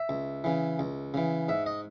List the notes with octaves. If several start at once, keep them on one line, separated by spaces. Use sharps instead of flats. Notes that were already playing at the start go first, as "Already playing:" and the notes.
Already playing: E5
C#2
C#3 E3
C#2
C#3 E3
G#2 E5
D#5